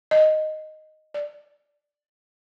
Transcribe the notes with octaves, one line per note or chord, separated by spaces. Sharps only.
D#5
D5